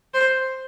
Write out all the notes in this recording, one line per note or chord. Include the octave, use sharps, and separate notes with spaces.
C5